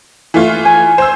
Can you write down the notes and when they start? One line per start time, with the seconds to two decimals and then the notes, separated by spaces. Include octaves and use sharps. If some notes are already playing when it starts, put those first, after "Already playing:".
0.34 E3 A3 F4
0.65 G#5
0.98 C5 E6